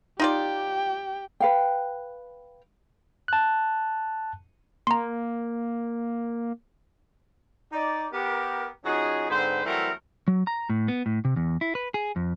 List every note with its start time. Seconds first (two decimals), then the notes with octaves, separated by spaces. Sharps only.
0.20 D#4 F4 G4 D5 G5
1.40 B4 F5 G5
3.28 A5 F#6
4.87 A#3 A#5 C6
7.72 D#4 D5
8.13 B3 G4 A#4
8.85 F3 C#4 D#4 F#4 G#4
9.30 G#2 D3 C4 B4 C5
9.65 E3 F#3 G3 A3 C4 A#4
10.28 F#3
10.47 A#5
10.69 A2
10.88 B3
11.06 A2
11.25 C3
11.36 E2
11.61 E4
11.75 B4
11.94 G#4
12.16 F2